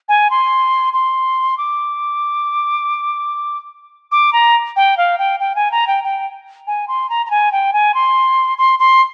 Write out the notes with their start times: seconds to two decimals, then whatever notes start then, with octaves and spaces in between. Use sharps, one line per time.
0.09 G#5
0.30 C6
0.93 C6
1.58 D6
4.12 D6
4.33 A#5
4.76 G5
4.97 F5
5.18 G5
5.40 G5
5.55 G#5
5.71 A#5
5.87 G5
6.04 G5
6.67 G#5
6.88 C6
7.10 A#5
7.26 A#5
7.31 G#5
7.52 G5
7.73 G#5
7.94 C6
8.58 C6
8.79 C6